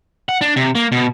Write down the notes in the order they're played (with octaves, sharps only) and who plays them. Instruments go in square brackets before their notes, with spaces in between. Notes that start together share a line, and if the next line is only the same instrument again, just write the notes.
[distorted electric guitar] F#5
D4
C3
A#3
B2